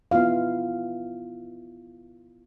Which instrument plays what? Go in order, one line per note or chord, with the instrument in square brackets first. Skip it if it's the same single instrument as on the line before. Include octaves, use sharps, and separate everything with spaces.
[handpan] B3 E4 F4 F5